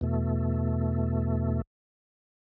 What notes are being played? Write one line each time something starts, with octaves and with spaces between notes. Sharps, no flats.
E2 B2 A3